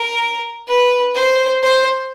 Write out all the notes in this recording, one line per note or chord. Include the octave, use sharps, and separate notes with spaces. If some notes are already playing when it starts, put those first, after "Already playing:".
Already playing: A#4
B4
C5
C5